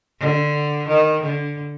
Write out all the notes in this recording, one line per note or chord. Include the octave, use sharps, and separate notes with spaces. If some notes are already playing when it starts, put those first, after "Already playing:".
D3
D#3
D3